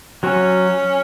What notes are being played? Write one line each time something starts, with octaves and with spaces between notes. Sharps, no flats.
F#3 C#4 F#4